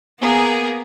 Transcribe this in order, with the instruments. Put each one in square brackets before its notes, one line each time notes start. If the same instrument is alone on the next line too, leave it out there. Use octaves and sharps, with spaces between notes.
[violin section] A#3 G#4 A#4 [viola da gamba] B3